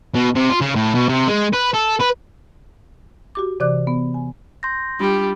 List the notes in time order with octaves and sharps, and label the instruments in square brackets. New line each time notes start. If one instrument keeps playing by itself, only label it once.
[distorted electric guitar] B2
C3
F4
C#3
A2
B2
C3
G#3
B4
A4
B4
[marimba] F#4 G4 D6
C3 E3 D5 D6 F#6
B3
G#5
[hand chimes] C6 G6 A#6
[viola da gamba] G3 [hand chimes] D4 B5 [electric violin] F4 G4